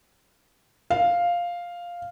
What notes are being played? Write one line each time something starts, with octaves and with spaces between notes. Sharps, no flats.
F5